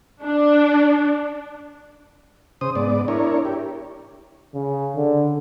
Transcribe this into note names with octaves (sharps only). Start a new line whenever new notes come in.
D4
C#3 C5 D#6
G#2 B3 D5
D4 E4 A#4 C#5
G4
C#3
D3